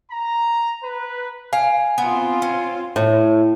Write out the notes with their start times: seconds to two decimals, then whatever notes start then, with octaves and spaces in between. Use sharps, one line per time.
0.12 A#5
0.83 B4
1.53 F5 G#5
1.98 B3 C4 F4
2.42 C#4
2.96 A2